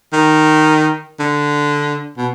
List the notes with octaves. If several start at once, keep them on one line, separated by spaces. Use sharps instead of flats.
D#3
D3
B2